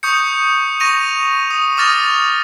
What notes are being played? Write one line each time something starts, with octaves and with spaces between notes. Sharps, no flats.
C#6 D#6 G6 C#7
C#6 A#6 D#7 F7
D#6
D6 D#6 F6 A6 A#6 F7